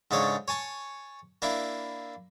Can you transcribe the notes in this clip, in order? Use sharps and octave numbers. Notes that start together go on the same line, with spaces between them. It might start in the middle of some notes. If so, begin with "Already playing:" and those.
G#2 C#3 D4 A4 C#5
C#5 G#5 A5 C#6
A#3 D4 E4 E5